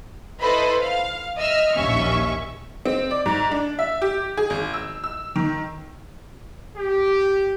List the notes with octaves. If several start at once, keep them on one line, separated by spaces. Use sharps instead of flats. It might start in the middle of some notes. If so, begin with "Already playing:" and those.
E4 A4 B4 C5 D#5 B5
F5
D#5 E5 E6 F6
A#1 D#2 C#4 E5 C#6
C4
D5
G#2
D4
E5
G4
G#4
G#1
E6
E6
D#3
G4